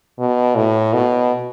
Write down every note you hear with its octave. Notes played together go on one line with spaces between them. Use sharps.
B2
A2
B2